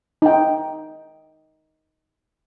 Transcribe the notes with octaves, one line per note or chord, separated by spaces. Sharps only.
D#4 G5